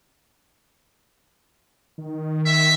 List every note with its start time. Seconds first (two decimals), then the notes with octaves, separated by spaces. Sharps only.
1.98 D#3
2.45 E5